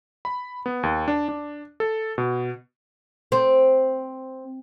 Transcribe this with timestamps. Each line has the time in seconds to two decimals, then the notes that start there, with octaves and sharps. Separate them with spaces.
0.25 B5
0.66 B3
0.83 D#2
1.08 D4
1.29 D4
1.80 A4
2.18 B2
3.32 C4